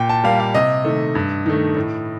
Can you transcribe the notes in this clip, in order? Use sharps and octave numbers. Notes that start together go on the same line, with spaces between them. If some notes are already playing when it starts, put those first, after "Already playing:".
Already playing: A#2 G5
A5
G3 A#3 F5
F5
C3 D#5
D#3 A3
G2
D#3 A3
A2